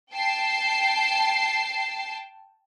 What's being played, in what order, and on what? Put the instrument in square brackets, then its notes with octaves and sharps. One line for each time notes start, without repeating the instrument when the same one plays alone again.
[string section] G5 A5 C7